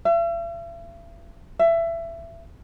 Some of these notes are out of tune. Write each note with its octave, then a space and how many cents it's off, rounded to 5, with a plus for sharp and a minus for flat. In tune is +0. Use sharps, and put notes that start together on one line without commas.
E5 +45
E5 +20